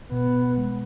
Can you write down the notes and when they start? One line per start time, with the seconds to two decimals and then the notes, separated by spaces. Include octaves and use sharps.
0.12 B2 B3
0.58 G#3